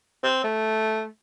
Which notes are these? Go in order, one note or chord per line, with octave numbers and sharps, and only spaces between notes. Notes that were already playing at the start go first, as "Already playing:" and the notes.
C4
A3